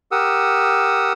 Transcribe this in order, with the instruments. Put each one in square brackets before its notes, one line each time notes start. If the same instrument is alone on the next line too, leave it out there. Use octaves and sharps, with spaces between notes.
[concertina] G4 A#4 F#5 D#6 E6